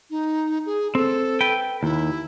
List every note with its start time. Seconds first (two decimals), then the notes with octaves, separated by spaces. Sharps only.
0.10 D#4
0.66 G#4
0.95 C4 A4
1.41 B4 G5
1.83 D#2 E4